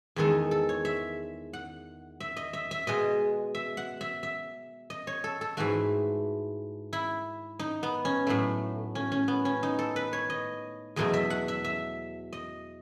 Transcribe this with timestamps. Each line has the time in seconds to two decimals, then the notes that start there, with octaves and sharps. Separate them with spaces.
0.16 E2 D#3 G#3 A4
0.51 A4
0.69 C#5
0.85 E5
1.53 F#5
2.20 E5
2.37 D#5
2.53 E5
2.71 E5
2.87 B2 G#3 D#5
3.55 E5
3.77 F#5
4.01 E5
4.23 E5
4.90 D#5
5.07 C#5
5.24 A4
5.41 A4
5.57 G#2 E3 A3 F#4
6.93 E4
7.59 D#4
7.83 B3
8.05 C#4
8.27 A2 F#3 A3
8.95 C#4
9.12 C#4
9.28 B3
9.45 C#4
9.63 D#4
9.79 A4
9.96 B4
10.13 C#5
10.30 D#5
10.96 E2 B2 F#3 A3 D#5
11.13 E5
11.30 F#5
11.48 E5
11.65 E5
12.33 D#5